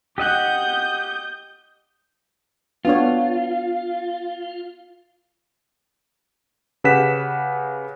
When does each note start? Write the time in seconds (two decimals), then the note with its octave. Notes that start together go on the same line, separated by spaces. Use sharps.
0.18 G4 D#5 F#5 D#6 G6
2.85 B3 D4 F4 C#5
6.84 C#3 G4 B4 F#5 B6 E7